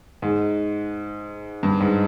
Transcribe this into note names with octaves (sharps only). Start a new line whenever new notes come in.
G#2
G2
G#2